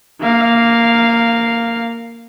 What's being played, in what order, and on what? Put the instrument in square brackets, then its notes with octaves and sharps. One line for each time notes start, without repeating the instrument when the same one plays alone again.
[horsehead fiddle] A#3 F5